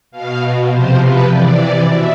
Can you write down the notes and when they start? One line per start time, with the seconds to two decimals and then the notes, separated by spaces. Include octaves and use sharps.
0.11 B2 F5
0.68 C3 F3 C5
0.98 B4
1.26 C3 E3 D5
1.84 B2 E5